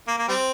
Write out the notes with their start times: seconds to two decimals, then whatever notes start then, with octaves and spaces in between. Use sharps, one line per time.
0.08 A#3
0.18 A#3
0.28 G3 C4